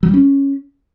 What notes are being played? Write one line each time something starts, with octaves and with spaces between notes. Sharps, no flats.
F#3
G3
C#4